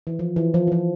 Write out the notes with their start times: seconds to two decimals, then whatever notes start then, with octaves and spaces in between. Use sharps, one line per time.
0.07 E3
0.19 F3
0.36 E3
0.54 F3
0.67 E3
0.72 F3